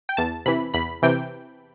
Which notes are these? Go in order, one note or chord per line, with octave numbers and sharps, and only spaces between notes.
G5
E2 A5
C3 E3 B5
E2 B5
C3 E3 G5